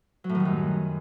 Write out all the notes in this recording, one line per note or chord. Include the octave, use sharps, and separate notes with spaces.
F#3
A2
D#3
G3
F#2